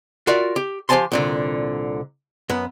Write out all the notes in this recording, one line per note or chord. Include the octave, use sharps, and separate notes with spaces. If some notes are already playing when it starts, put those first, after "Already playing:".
F4 F#4 A#4 D5 E5
G4
F3 G4 C5 G#5 A5 C6
C2 A#2 D3
F#2 B3